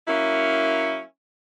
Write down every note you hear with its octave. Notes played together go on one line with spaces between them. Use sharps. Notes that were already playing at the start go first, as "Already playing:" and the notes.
F#3 A#3 C#4 E4